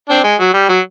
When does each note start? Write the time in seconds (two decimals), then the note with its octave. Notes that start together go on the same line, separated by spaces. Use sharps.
0.09 C4 D4
0.24 G#3
0.40 F#3
0.54 G3
0.69 F#3